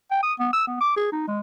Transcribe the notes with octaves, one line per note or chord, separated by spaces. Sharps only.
G5
D#6
B3
E6
B3
D6
G#4
D#4
G#3